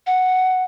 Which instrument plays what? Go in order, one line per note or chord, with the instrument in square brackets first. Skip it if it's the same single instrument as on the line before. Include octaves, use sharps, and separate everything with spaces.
[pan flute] F#5